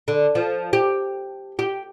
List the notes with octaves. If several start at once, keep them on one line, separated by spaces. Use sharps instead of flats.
D3
F3
G4
G4